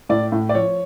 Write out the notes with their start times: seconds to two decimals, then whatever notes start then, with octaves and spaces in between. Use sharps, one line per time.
0.09 A2 D5
0.32 A2
0.49 D5
0.54 F3 C#5